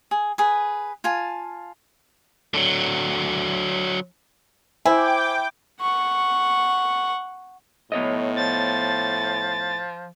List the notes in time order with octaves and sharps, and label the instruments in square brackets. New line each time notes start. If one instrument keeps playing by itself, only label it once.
[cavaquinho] G#4
G#4 B4
F4 G#5 A5
[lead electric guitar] D3 F#3
[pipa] E4 [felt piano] C5 G#5 [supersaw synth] G5 D6
[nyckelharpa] F#5 C#6
[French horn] A2 [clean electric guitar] B3 C#5 D#5
[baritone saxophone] F3 [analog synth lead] A6